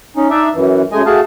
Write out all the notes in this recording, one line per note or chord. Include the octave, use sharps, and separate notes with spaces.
C#4 D#4
D4 D#4 D5 E5
F#2 E3
F#2 G#3 A3 D#5 G#5
A3 F#4 G#4 F5 A5